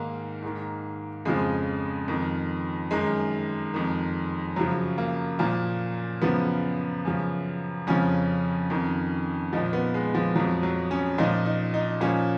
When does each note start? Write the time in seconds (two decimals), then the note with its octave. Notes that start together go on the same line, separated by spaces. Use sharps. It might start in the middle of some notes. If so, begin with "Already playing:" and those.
Already playing: G#2 D#3 A#3
0.42 G#2 D#3
1.25 F2 C#3 F3 G#3
2.08 F2 D#3
2.91 F#2 D#3 G#3
3.74 F2 D#3
4.56 F#2 C#3 F3 F#3
4.98 A#3
5.39 A#2 F3 A#3
6.22 F#2 C#3 F3 B3
7.05 F#2 C#3 F3
7.87 F2 C#3 F3 C#4
8.70 F2 D#3
9.53 A#2 F3 D#4
9.73 B3
9.94 G#3
10.15 F3
10.35 F2 F3 F#3
10.63 F#3
10.91 C#4
11.18 A#2 F3 D#4
11.45 D#4
11.74 D#4
12.01 A#2 F3 C#4